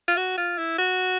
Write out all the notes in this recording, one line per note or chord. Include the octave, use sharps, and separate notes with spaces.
F4
F#4
F4
E4
F#4